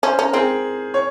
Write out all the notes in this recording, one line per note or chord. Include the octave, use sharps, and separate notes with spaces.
C#4 C5
C#4 A#4
C4 G#4
C#5